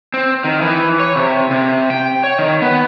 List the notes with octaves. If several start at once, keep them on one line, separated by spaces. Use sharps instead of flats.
C4
D#3
E3
C#5
C3
C3
G5
C#5
D#3
B3